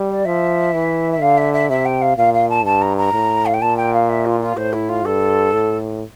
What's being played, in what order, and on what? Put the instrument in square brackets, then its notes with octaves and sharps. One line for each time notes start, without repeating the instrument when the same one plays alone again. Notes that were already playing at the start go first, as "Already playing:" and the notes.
Already playing: [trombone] G3
[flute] D5
[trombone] F3 [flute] E5
[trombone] E3
[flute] E5
[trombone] D3 [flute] F5
[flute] E5
E5
[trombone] C3 [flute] E5
[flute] G5
F5
[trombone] A#2 [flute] F5
[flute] F5
A5
[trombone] G2 [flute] A5
[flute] A#5
A#5
[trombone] A2
[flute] F5
G5
[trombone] A#2 [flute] A5
[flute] G5
F5
E5
F4
F4
[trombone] A2 [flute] C5
[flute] E4
F4
[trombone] G2 [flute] A4
[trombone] A2